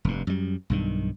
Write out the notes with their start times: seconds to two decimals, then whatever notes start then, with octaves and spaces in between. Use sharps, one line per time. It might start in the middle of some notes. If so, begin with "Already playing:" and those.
0.05 F1 G2
0.27 F#2 G3
0.70 B1 G2 D#3